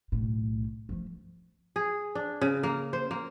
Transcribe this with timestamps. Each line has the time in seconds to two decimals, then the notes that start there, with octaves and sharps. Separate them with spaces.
0.12 B1 A2
0.89 F3 A3
1.76 G#4
2.15 D4
2.41 C#3
2.63 A#3
2.93 C5
3.11 A#3